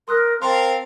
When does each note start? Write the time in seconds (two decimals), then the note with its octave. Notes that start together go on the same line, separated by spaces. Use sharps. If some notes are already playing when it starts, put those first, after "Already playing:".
0.08 A#4 C6 D#6 F#6
0.42 C4 A#4 F5 A5 C6